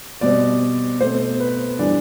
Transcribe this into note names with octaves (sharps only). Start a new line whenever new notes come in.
B2 G3 C4 D5
B2 A3 C4 C5
B4
E3 G3 D4 D5